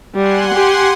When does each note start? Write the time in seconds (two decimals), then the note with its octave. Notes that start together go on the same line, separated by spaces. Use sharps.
0.15 G3 F#5 G#5 C6
0.54 G4